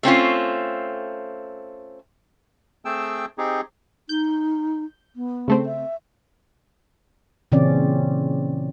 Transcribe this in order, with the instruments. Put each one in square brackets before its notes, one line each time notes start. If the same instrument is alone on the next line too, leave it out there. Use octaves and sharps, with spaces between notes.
[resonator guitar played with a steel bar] A3 C4 C#4 F4
[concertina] A3 C4 G#4 G5 A5 E6
C4 D#4 G4 G#4
[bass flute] D#4 [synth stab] G6
[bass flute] B3
[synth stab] C#3 A3 C4
[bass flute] E5
[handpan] A#2 C#3 E3 C4 C#4 D5